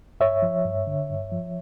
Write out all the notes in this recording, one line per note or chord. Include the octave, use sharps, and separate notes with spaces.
G2 C#5 E5
F3
G2
D3
G2
F3